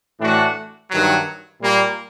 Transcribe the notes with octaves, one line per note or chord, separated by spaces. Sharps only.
A2 E3 A3 D4 F#4
G2 D#3 F#3
A#2 G3 A#3